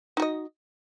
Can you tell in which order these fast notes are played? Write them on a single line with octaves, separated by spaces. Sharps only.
D#4 F#4 D#5